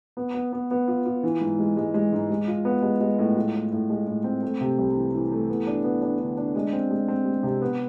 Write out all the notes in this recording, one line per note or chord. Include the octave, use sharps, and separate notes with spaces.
B3
B3
B3
B3
F4
F4
E3
G#2
G#3
G#3
G#3
G#2
G#3
F4
B3
G#3
G#3
A2
F4
A2
A2
G#3
A2
C4
A3
C3
C2
E3
E3
A3
B3
D4
B3
D4
D3
D4
G#3
C4
G#3
C4
G#3
C3
B3